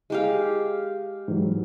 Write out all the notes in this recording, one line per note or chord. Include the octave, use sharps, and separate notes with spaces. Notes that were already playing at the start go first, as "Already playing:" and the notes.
G#3 G4 F5
G#2 E3 F#3